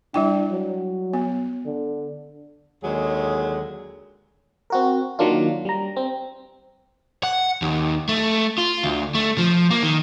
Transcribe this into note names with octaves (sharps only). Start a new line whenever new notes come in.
G3 D4 E4 G5
F#3
B3
D3
D#2 D3 F#3 G#3 G#4
C4 F#4 A#4
D#3 F#3 A#3 D4 F4
G3 A#5
C4
F#5
D#2
A3
F4
D2
A3
F3
A#3
D#3